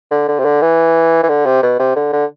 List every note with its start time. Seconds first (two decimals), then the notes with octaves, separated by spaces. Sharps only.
0.11 D3
0.28 D3
0.39 C3
0.45 D3
0.61 E3
1.23 E3
1.29 D3
1.46 C3
1.63 B2
1.79 C3
1.96 D3
2.13 D3